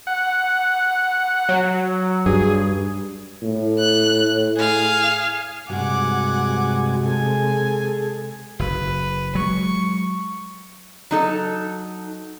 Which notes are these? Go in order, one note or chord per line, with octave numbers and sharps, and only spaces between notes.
F#5
F#3
G2 G#4
A2
F#6
G#4 F5
G2 C3 G#3 F#4 F#5 G#5 D6
G#4 A4 G#5
F#1 B4
F#3 G#3 C#6
F#3 D#4 A4